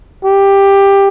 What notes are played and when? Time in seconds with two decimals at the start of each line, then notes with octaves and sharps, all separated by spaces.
0.24 G4